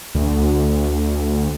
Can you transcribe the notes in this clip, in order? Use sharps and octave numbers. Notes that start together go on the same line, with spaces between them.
D2